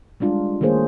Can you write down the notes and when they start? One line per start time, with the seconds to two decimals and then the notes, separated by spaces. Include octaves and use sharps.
0.20 G3 G#3 D4 F4
0.61 D#3 A3 A#3 G#4 C5 C#5